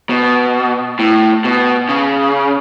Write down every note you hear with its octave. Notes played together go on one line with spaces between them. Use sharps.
B2
A2
B2
C#3